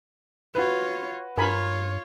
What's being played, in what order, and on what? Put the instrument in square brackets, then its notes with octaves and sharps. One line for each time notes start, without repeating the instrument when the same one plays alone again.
[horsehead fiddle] F4 C#5 [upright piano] F#4 B4
[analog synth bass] G2 [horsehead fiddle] F4 C#5 [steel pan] A#4 G#5 B5